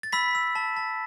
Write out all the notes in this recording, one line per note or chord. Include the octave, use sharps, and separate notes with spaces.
A6
B5 E6 B6
E6
A5
A5